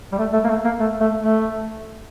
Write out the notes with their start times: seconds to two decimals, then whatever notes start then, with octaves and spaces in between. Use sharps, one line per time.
0.12 G3
0.18 A3
0.33 A3
0.44 A#3
0.49 A3
0.64 A#3
0.80 A3
1.00 A3
1.21 A3